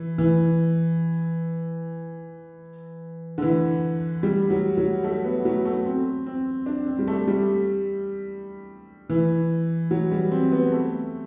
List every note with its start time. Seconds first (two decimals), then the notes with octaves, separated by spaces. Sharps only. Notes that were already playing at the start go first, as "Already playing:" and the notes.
Already playing: E3
0.18 E3
3.38 D3
3.42 E3
4.23 G3
4.50 F#3
4.77 F#3
5.04 A3
5.24 B3
5.45 F#3
5.65 A3
5.86 C4
6.26 C4
6.66 D4
6.86 C4
6.99 G3
7.08 A3
7.27 G3
9.10 E3
9.91 F#3
10.11 G3
10.31 C4
10.52 B3
10.72 A3